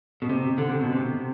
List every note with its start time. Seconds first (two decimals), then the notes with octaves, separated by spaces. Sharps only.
0.22 B2
0.29 C3
0.58 D3
0.69 C3
0.81 B2
0.93 C3